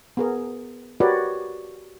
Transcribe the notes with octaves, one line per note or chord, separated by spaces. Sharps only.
B3 G#4 A#4
F#4 G4 A#4 B4 C#5 D5